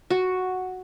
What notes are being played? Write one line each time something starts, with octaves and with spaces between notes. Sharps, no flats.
F#4